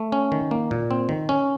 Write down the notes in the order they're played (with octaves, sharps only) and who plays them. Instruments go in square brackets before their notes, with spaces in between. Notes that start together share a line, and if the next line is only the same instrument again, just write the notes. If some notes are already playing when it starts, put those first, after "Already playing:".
Already playing: [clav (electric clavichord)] A3
C#4
D#3
A#3
A#2
C4
D#3
C#4